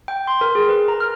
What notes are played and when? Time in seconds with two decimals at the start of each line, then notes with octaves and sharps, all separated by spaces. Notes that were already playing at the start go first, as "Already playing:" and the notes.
0.08 G5
0.27 C6
0.41 A#4
0.55 G#4
0.69 B4
0.88 A#5
1.00 F6